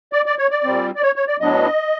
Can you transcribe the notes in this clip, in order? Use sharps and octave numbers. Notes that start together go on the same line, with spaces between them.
D5
D5
C#5
D5
A#2 G3 C4
D5
C#5
C#5
D5
A2 F#3 B3 D4 D#5